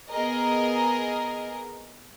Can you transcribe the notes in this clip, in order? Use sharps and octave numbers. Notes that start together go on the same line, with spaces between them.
B3 G#4 A#4 D#5